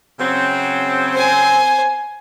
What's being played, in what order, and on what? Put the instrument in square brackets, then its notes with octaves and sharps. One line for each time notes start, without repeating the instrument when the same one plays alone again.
[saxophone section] C#3 F#3 C4
[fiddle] C5 G#5